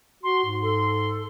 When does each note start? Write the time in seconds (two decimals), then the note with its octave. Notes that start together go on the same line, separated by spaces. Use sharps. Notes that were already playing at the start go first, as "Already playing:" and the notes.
0.24 F#4 C6
0.46 G#2
0.62 A4 C6